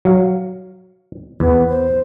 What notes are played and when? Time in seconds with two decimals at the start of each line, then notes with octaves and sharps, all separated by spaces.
0.05 F#3 F5
1.40 E2 B3
1.69 C5